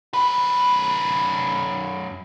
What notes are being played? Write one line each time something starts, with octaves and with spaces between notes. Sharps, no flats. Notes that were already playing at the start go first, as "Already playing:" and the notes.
F#2 B4